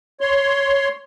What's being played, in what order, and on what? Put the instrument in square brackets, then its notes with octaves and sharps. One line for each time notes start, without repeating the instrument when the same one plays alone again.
[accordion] C#5 C6